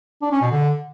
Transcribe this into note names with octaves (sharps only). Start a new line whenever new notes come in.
D4
C#4
B2
D3